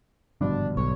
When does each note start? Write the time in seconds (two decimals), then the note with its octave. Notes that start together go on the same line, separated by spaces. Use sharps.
0.41 G#1 G2 B2 D3 F3 D4
0.77 B1 C#5